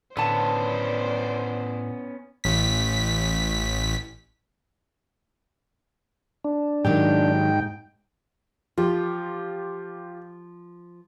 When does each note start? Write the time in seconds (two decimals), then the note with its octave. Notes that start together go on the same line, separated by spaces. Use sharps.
0.17 A2 D3 B3 C#4 C5 D5 A5
2.44 A1 B6
6.44 D4
6.85 G#2 D#3 F#3 G4 G5
8.78 F3 F4 G4